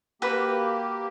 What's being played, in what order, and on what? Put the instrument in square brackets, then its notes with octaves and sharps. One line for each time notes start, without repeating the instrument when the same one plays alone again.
[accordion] A#3 G4 [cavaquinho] F#4 B4